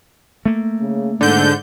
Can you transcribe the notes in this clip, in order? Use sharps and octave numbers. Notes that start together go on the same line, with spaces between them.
A3 A#3
C#3
G#2 D3 G6